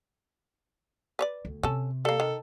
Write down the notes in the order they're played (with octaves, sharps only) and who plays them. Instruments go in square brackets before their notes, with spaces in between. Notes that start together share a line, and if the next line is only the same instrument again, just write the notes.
[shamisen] B4 C#5 D5
[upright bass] D2
[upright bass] C3 [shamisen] C#4 A4
[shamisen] G3 A#3 [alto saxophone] A4
[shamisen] D#3